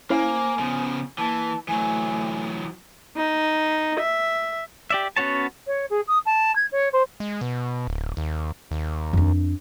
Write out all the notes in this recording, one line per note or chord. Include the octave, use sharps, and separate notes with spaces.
A#3 C#4 E4 C5 F5 G#5
C#3 F3 B3
E3 A#3 A5
E3 F#3 A3 G#5
D#4
E5
G4 D5 E5
B3 C#4 F#4 C#5 A5
C#5
G#4
D#6
A5
G#6
C#5
C5
G#3
B2
D1
D#2
D#2
F2 D4